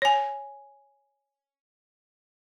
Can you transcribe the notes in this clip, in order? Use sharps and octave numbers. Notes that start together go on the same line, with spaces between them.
C#5 G#5